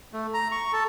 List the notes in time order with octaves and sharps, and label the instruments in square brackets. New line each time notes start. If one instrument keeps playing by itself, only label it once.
[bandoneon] A3
A#5
C#6
A4